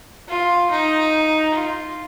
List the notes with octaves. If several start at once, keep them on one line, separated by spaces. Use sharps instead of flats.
F4
D#4
F4